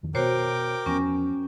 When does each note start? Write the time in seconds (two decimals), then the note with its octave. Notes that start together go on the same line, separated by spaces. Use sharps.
0.03 F2 D#3
0.15 B2 B3 F#4 A#4 C5 C#5 G5 D6
0.86 E2 F3 B3 C#4 G#5 A#6